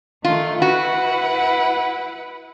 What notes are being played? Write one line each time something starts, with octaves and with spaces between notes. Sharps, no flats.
D#3 A3 F4
E4 F#4 B4 F#5